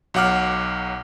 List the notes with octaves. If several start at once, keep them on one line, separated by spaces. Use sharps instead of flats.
B1 F#3 F#5 D6 F6